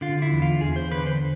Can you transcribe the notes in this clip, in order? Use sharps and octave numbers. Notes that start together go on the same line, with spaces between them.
D3 F4
E4
E2
F4
E2 G#4
C5
D3 B4
C5